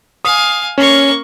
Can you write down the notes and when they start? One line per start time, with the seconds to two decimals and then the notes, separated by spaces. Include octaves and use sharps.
0.25 F5 G#5 D#6
0.78 A#3 C#4 C#6